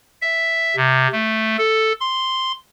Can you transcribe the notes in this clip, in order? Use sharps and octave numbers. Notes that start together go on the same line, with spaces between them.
E5
C3
A3
A4
C6